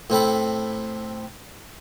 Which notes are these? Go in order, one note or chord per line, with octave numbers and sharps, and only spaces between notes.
A2 C4 A4 B5